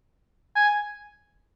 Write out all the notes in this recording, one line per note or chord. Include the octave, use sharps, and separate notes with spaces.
G#5